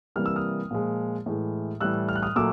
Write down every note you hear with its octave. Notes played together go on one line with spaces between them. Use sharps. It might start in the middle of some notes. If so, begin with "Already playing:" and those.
C3 E3 G3 A#3 F6
E6
D#6 F6
A#2 F3 G#3
A2 E3 G#3
A2 E3 G3 E6 F#6
F6
F#6
D#6 F6
A#2 F#3 A3 D6 E6